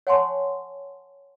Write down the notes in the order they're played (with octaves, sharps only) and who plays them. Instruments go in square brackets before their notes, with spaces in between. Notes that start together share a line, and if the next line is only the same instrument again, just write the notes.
[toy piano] C#5 F#5 G#5 A5 C6 C#6